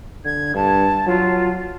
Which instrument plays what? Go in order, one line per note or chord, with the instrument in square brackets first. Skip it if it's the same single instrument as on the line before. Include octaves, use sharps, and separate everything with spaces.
[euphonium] D3 [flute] G#6
[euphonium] G2 [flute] A5
[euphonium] F#3 [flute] F4